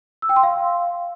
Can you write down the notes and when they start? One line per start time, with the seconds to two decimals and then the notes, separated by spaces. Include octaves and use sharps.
0.22 E6
0.29 G5
0.36 C6
0.43 F5